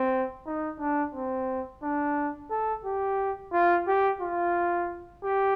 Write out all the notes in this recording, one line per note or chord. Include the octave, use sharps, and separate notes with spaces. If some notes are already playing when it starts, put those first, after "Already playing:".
Already playing: C4
D#4
D4
C4
D4
A4
G4
F4
G4
F4
G4